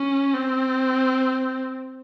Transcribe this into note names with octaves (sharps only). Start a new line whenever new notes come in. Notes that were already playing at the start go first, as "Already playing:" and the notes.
Already playing: C#4
C4